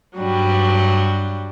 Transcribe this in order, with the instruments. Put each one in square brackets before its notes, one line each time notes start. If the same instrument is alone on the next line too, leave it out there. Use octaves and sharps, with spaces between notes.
[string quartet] G2 F#3 G3 D4